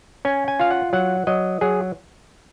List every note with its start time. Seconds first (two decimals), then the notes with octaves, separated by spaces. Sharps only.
0.25 C#4 G#5
0.48 G#5
0.60 F4 F5
0.71 F#5
0.93 F#3 F#5
1.27 F#3 D#5
1.61 F#3 G#4